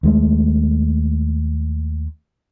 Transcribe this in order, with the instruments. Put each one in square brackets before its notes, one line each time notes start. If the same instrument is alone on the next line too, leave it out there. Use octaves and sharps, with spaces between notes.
[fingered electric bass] D#2 G#3 A3